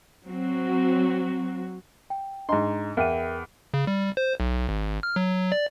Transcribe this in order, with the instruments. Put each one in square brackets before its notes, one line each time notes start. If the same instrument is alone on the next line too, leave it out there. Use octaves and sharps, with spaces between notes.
[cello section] F#3 C4 F#4
[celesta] G5
[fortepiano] G#2 C6 [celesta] D4 D#5 A#5
[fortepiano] E2 [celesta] A#4 G5 D#7
[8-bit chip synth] C#3
G3
C5
B1
G#1
F6
F#3
D5